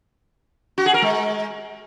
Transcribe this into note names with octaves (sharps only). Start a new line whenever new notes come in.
F#4
G#4
A#4
G#3